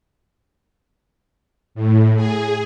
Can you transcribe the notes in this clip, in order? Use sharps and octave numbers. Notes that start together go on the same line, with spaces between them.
A2
G#4